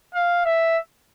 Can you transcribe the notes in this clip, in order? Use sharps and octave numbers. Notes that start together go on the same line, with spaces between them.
F5
E5